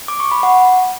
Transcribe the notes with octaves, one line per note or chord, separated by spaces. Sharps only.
D6
C#6
B5
F#5